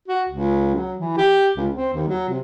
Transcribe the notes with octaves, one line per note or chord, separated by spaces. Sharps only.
F#4
C#2
F#3
E3
G4
C#2
C4
D#2
F#3
C3